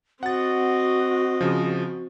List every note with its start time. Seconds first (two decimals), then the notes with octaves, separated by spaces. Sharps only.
0.23 C4 F#4 D#5 F#5 A6
1.41 C#3 F3